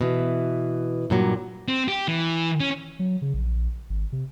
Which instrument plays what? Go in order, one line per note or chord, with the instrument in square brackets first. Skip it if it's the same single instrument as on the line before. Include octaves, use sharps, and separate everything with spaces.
[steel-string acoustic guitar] B2 E3
G2 A#2 F#3
[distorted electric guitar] C4
G4
E3
C#4
[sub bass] F#3
C#3
A#1
G#1
C3